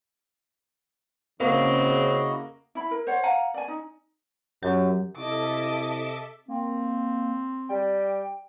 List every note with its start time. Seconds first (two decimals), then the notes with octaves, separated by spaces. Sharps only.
1.40 C#3 A#3 C4 E4 F#4 D#5
2.75 E4 B5
2.91 A#4
3.07 C5 C#5 F#5
3.23 F5 F#5 G#5 A#5
3.54 D5 G#5
3.68 D#4
4.63 F#2 F#3 G4
5.17 C3 E4 A4 D#5 E5 A5 D6
6.48 A#3 C4
7.69 G3 G5